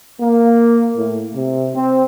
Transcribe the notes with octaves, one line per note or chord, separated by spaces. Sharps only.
A#3
A2
C3
C4